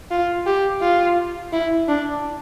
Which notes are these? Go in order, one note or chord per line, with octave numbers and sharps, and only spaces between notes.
F4
G4
F4
E4
D4